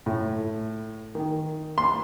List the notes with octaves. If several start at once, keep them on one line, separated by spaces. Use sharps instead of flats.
A2
D#3
C6